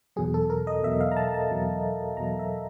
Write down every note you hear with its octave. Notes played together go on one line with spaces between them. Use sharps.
E2 B2 F#3 G#4
A4
A#4
D#5
E2 B2 F#3 E5
F5
A#5
A5
A5
E2 B2 F#3
E2 B2 F#3 A#5
E5